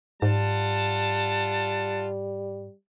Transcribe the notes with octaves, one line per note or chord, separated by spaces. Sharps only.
G#2 G3 F4 F#5 A5